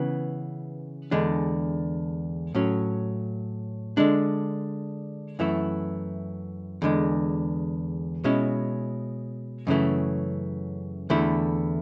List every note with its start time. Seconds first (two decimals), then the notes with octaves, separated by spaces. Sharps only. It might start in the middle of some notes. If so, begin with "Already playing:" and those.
Already playing: C#3 E3 B3
1.11 E2 D3 G#3 D4
2.55 A2 F#3 C#4
3.97 D3 G#3 D4
5.39 F#2 E3 A3 E4
6.82 E2 D3 G#3
8.24 B2 G#3 C#4 E4
9.67 F#2 C#3 E3 A3
11.10 E2 D3 A3 E4